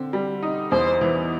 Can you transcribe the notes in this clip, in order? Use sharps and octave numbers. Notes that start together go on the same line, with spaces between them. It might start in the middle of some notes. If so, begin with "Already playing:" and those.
Already playing: D3 C4
G3
D#4
E2 C5
E3